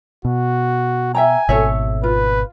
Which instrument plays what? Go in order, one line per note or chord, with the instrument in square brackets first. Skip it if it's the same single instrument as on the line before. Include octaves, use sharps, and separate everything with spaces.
[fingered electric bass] B2 [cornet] F#4
[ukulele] E5 G5 A#5 [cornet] G#5
[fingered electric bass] G#1 B2 [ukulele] A4 C#5 E5
[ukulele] F4 [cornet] B4